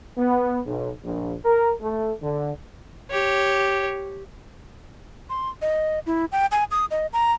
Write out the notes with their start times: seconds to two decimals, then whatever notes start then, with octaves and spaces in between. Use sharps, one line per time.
0.18 B3
0.66 B1
1.03 A#1
1.45 A#4
1.81 A3
2.22 D3
3.11 G4 C#5
5.30 C6
5.62 D#5
6.06 E4
6.32 G5
6.52 G#5
6.71 D#6
6.91 D#5
7.13 A#5